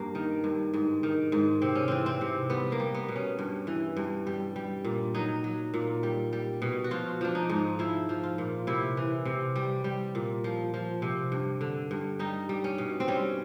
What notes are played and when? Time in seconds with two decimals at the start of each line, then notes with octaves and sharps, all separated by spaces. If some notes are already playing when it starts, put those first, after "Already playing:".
Already playing: G2 A#3
0.15 D#3
0.44 G2
0.74 G#2
1.03 D#3
1.32 G#2
1.62 C3 C4
1.75 C#4
1.88 E3 C4
2.06 C4
2.21 C3
2.50 G3 B3
2.72 A#3
2.80 G3
2.94 B3
3.08 B2
3.16 C#4
3.39 G2
3.67 E3
3.97 G2
4.27 G3
4.56 G3
4.84 A#2
5.14 F#3 D#4
5.44 F#3
5.74 A#2
6.03 G3
6.33 G3
6.62 B2
6.84 F#4
6.91 F3 F4
7.21 F3 D4
7.35 D#4
7.49 G#2
7.79 F3 E4
8.09 F3
8.23 F4
8.38 A#2
8.67 C3 E4
8.97 E3
9.25 C3
9.56 G3
9.84 G3
10.15 A#2
10.44 F3
10.74 F3
11.02 C3
11.32 G2
11.61 D3
11.91 G2
12.19 G3 D#4
12.49 G3
12.64 C#4
12.78 B2
13.00 C4
13.08 G3 C#4